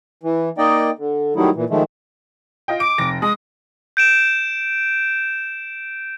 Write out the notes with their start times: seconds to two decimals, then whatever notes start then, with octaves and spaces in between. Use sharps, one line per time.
0.23 E3
0.58 A#3 D#4 D5 D#5 G5
0.99 D3
1.36 D#3 F#3 G3 A3 D#4 E4
1.56 A#2 E3
1.70 D#3 F3 G#3 A3
2.68 F4 D#5 G5
2.80 D6 D7
2.98 F1 A#6 D7
3.22 G#3 D#6
3.97 G6 D7 E7